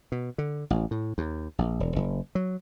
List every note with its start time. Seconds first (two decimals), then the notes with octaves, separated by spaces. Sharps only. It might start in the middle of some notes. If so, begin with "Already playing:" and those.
0.12 B2
0.38 D3
0.70 A1
0.91 A2
1.18 D#2
1.59 A#1
1.80 E1
1.96 F#1
2.35 F#3